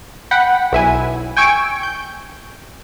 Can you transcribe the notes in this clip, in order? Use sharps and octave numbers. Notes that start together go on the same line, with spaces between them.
F#5 G5 B5
B1 E4 G#5
G5 G#5 C#6 E6 D7
G6